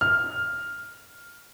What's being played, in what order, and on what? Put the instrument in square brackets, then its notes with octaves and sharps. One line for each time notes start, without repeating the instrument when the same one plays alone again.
[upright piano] F6